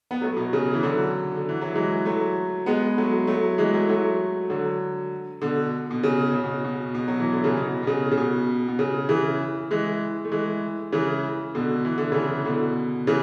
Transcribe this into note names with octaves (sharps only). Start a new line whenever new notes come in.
B3
F#3 A3
B2
C#3
E3
D3 F#3
D3
E3
F#3
E3 G#3
F#3 A3
G#3 B3
F#3 A3
F#3 A3
E3 G#3
F#3 A3
F#3 A3
D3 F#3
B2 D3
B2
C#3
C#3
B2
B2
B2
F#3
E3
D3
C#3
B2
B2
C#3
C#3
B2
B2
C#3
C#3 E3
E3 G#3
A3
E3 G#3
C#3 E3
B2 D3
E3
D3
C#3 E3
B2 D3
C#3 E3